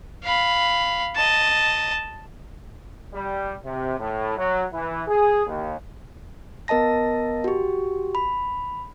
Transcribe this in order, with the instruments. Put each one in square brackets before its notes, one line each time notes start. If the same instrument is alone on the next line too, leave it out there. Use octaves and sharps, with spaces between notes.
[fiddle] F5 B5
D#5 A5
[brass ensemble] G3
C3
A2
F#3
E3
G#4
D#2
[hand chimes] B3 A#4 D#5 A5 A#6
F#4 G4
B5